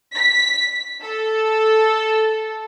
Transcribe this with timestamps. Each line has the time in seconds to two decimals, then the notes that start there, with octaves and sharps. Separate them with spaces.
0.16 B6
1.04 A4